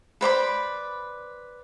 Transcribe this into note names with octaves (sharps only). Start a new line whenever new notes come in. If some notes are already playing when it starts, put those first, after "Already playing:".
B4 C5 D5 B5